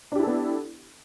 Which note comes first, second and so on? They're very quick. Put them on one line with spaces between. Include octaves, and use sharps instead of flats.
D4 G4 E4 A4 B3